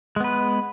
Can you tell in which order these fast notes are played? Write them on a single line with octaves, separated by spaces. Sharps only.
G#3 B3 B4